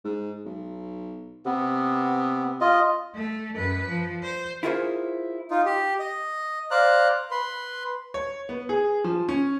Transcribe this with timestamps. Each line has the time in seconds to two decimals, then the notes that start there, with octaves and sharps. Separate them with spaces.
0.04 G#2
0.45 B1
1.46 C3 B3
2.61 F4 D#5
3.14 A3
3.55 F#2 B4
3.88 F3
4.22 C5
4.63 E4 F4 G#4 A#4 C5 C#5
5.50 D#4 F4
5.65 G4
6.00 D#5
6.71 C5 D5 F5 A#5 F#6
7.31 B4 C6
8.14 C#5
8.49 B3
8.69 G#4
9.04 F3
9.29 C#4